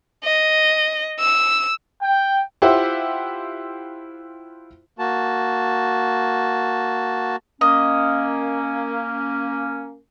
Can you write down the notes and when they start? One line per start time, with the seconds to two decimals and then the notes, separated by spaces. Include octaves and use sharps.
0.24 D#5
1.20 E6
2.02 G5
2.62 E4 F4 G4 C5 E5 F#5
4.99 A#3 F#4 A5
7.61 A#3 C#4 D#5